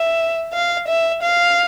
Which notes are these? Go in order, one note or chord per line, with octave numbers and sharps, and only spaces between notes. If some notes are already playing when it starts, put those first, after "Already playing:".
Already playing: E5
F5
E5
F5